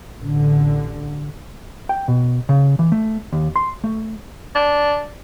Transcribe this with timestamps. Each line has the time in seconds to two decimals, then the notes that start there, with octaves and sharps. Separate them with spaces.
0.17 A1 D3
1.89 G5
2.08 B2
2.49 C#3
2.79 E3
2.92 A3
3.33 D#2
3.56 C6
3.84 A3
4.55 D4